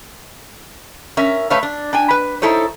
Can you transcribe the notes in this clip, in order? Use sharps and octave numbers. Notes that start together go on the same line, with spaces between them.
C#4 A#4 E5
A3 B4 C#5 E5 F5
D4
D4 G5 G#5
B4
D#4 E4 A4 C5 C#5